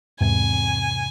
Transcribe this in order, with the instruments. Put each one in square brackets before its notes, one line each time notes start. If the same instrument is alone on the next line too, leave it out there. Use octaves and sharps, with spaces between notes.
[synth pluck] E2 G#2 C3 [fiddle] G#5